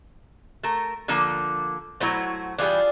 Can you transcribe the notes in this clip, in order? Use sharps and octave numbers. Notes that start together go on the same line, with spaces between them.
A3 A#4
D3 F3 A#3
F#3 A3 E4 F#4 C5
E3 G3 D4 F4 G#4